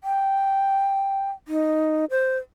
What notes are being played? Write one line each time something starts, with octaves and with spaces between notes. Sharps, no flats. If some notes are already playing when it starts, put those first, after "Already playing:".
G5
D#4
C5